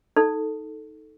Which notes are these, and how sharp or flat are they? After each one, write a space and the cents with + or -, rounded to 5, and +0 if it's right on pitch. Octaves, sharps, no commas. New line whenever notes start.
D#4 +15 A4 +0